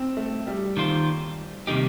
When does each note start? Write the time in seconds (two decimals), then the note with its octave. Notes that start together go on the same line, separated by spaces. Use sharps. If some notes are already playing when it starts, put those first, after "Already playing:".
Already playing: C4
0.17 A3
0.47 G3
0.77 D#3 A#3 F4 C5
1.67 C3 D#3 G3 A#3 D#4 G4